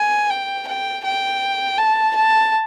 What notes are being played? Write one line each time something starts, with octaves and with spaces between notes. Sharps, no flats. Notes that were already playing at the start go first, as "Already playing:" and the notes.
Already playing: G#5
G5
G5
G5
A5
A5